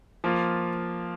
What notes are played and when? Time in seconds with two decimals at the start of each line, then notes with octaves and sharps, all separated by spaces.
0.24 F3 A#3 F4